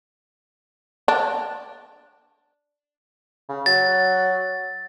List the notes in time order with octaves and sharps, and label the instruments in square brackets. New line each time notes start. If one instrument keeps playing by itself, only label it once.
[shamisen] D4
[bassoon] C#3
[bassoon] F#3 [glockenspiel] A6